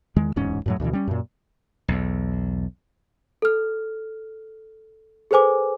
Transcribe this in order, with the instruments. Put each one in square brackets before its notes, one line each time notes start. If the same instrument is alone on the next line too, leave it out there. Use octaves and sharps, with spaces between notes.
[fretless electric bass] E2 D#3 G#3
D1 E2 G#2 C#4
F#2 A2 F#3
D2 B2 E3
G3 C#4
F#2 A#2
[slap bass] B1 E2
[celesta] A4 F6
G#4 A4 B4 C5 G#5 D6